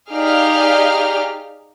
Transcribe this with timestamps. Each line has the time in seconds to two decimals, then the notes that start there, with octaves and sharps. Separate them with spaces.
0.11 D#4 G4 G#4 D5 F5 F6